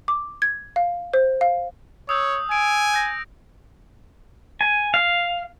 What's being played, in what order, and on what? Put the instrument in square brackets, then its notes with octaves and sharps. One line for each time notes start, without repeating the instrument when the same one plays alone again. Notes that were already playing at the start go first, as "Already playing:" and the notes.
[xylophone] D6
G#6
F5
C5
F5
[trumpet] C#5 [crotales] D#6 E6 G6
[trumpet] G#5 [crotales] D7
[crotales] G6 A#6
[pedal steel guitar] G#5
F5